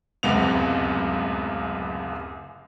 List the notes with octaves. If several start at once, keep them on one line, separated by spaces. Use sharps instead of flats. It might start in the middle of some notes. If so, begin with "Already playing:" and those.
D1 C#2 F#2 C3 B3 F7